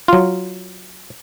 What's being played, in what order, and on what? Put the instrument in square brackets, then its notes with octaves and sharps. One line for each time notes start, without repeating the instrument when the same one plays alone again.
[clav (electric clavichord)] F#3 F4